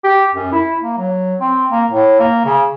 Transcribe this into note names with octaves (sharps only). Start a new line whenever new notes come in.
G4
F#2
E4
A#3
F#3
C4
A#3
A2
A#3
C#3